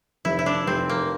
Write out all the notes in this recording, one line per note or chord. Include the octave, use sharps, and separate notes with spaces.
F1 E4
E4
D4
F1 C4
A#3